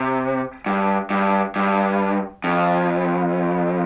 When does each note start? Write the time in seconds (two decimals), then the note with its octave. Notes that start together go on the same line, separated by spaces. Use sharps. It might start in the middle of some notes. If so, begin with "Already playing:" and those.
Already playing: C3
0.66 G2
1.10 G2
1.56 G2
2.44 F2